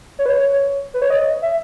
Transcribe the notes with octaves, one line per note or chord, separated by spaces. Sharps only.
C#5
B4
C#5
B4
C#5
D#5
E5